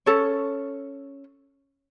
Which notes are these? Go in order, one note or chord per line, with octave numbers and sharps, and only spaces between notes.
C#4 A4 C#5